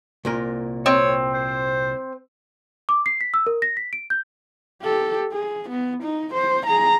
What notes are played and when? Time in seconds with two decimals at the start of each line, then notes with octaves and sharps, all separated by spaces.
0.25 C2 A#2 A#4
0.86 C4 C#5
1.33 C5
2.89 D6
3.06 C7
3.21 B6
3.34 E6
3.47 A#4
3.62 A#6
3.77 B6
3.93 D7
4.10 G6
4.82 G4 A4
5.32 G#4
5.70 B3
6.03 D#4
6.34 C5
6.66 G#4 A#5